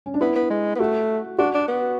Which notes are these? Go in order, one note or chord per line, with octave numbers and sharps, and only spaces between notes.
C#4
D4
B3 E4
B3
G#3
B3
A3 F#4
D4 F#4
D4
B3